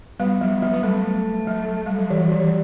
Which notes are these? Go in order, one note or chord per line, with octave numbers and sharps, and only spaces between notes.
G3 B3
F#3
F#3
B3
G3 A3
F#3
G3
F#3
E3 G3
F#3
G3
E3